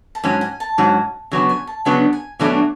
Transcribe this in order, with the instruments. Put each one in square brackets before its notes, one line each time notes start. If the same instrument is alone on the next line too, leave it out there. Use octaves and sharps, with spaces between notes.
[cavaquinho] A5
[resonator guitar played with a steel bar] G#2 F#3 C#4 [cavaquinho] G#5
[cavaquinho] G#5
A5
[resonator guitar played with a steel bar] G#2 F#3 C#4
[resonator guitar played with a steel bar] C#3 F#3 B3 D4 [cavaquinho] G#5
[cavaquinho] G#5
A5
[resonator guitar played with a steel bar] C#3 F#3 B3 D4 [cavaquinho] G#5
[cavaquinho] G#5
[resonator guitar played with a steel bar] B2 F#3 A3 D4 [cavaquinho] G#5